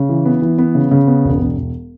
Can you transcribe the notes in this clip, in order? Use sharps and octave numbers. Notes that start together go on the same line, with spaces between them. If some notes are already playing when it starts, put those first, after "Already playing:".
Already playing: C#3
E3
B3
E3
B3
C#3
C#3
B3
E1
E1
E1